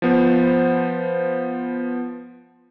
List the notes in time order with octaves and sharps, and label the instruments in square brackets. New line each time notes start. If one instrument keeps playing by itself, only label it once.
[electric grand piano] F3 B3 C5